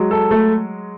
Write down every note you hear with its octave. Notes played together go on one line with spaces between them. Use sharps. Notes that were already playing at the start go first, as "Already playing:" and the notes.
Already playing: F#3 G#3
A4
A3